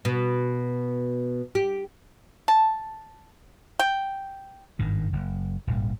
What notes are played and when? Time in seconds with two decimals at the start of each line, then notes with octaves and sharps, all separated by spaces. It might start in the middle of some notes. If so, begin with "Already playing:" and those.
0.05 B2
1.55 G4
2.48 A5
3.79 G5
4.79 G#1 G2 D#3
5.13 F#1
5.67 D#1 G#1 G2